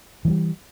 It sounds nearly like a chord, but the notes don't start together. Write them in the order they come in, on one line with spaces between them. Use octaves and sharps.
E3 G#3 G3